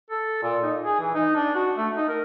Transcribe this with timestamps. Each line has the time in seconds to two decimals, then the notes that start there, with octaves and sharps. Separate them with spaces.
0.10 A4
0.42 A#2
0.63 D#4
0.82 G#4
1.00 E3
1.15 D#4
1.35 D4
1.55 F#4
1.77 A3
1.97 D#4
2.09 A#4